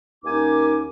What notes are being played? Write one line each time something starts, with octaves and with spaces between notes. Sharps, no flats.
D#2 A#3 C#4 D#4 G#5 D6